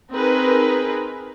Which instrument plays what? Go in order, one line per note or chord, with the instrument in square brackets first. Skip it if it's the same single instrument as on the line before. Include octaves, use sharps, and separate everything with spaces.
[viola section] C4 D#4 G#4 A#4 B4